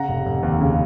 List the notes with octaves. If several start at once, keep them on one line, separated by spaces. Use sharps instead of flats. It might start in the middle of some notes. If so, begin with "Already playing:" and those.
Already playing: C#3 F#5 A#5
F1
F1
D#2
C#3